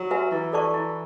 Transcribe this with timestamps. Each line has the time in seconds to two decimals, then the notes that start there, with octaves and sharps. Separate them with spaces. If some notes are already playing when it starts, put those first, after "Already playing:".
Already playing: F#3
0.11 F#4 B4 E5 G#5
0.31 E3 E4
0.52 A4 D5 A5 C#6
0.74 E4